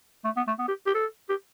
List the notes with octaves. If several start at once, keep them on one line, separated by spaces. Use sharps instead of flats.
A3
B3
A3
B3
G4
G4
A4
G4